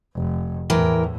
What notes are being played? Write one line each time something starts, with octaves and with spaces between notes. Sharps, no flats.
F1
E2 A2 E3 A#4 G5